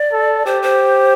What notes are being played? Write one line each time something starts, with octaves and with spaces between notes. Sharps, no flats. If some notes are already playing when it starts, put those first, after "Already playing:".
Already playing: D5
A4
G4 C5
C5